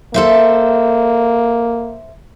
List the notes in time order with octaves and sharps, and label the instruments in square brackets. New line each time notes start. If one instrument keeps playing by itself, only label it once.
[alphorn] A#3 [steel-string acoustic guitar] A4 C5 E5